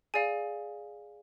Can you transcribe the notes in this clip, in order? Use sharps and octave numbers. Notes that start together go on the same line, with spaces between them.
G#4 D5 F5 G#5